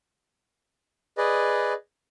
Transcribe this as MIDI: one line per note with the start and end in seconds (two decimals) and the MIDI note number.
1.18 1.73 68
1.18 1.73 71
1.18 1.73 74
1.18 1.73 75